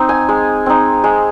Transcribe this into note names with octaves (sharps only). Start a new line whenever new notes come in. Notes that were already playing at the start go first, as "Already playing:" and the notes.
Already playing: C4 D#4
G#5
G#3
C4 D#4
G#3